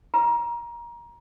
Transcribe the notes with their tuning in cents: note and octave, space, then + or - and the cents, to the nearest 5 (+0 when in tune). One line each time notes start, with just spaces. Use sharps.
A#5 +25